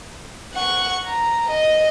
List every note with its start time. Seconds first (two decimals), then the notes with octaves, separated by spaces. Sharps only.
0.54 F#5 C#6
1.05 A#5
1.50 D#5